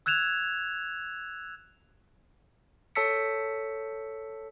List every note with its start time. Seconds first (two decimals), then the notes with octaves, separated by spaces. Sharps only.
0.06 E6 F#6 G#6 E7 F7
2.95 A4 C#5 A5 E6 B6 C#7